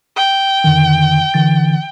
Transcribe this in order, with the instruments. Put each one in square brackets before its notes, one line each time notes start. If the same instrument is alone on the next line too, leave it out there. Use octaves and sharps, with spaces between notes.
[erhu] G5
[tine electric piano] F2 D3 D#3
D3 E3 A6